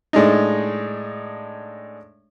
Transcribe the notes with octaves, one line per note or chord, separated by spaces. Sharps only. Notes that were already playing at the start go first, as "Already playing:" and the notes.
A2 G#3 D4 D#4